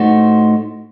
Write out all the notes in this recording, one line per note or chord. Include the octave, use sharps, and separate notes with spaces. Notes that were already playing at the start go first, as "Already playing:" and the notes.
Already playing: A2 A3 D#4 F#4 C5